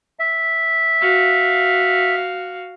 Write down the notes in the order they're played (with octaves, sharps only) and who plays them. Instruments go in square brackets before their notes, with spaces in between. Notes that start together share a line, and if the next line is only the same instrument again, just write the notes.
[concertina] E5
[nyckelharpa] F#4 F5